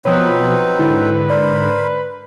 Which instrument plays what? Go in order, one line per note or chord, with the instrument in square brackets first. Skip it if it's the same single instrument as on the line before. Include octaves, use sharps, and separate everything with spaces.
[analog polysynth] B2 F3 [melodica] F#3 C4 D#4 [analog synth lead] B4 [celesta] C#5 D#6
[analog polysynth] G#2 D3 [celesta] E4
[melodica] A#4 C5 B5 [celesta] D5